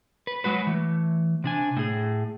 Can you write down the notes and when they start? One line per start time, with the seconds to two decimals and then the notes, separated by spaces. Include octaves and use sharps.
0.27 B4
0.44 F#3 G#3 F#4 B4
0.67 E3 A3
1.44 C3 D4 G#5
1.77 A2 G#4